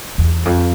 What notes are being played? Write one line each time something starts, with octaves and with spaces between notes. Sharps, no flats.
E2
F2